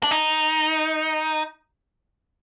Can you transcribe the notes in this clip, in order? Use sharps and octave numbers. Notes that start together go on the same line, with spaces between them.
D4
D#4